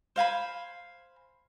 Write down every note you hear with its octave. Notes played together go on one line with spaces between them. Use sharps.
C5 F5 G#5 B5